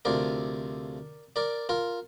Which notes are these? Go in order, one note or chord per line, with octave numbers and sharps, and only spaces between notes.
D2 C3 F3 A#4 D5
A#4 D5
F4 A#4